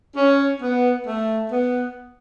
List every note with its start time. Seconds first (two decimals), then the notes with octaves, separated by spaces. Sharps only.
0.16 C#4
0.61 B3
1.06 A3
1.50 B3